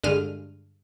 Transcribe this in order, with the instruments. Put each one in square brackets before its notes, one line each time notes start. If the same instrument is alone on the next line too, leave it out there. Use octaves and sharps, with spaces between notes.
[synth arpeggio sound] G2 D3 G#3 F6 D#7